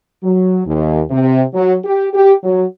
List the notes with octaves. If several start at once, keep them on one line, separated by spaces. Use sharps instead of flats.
F#3
D#2
C3
F#3
G4
G4
F#3